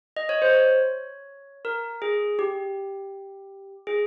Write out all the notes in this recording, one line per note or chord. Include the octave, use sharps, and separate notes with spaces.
D#5
C#5
C5
C#5
A#4
G#4
G4
G#4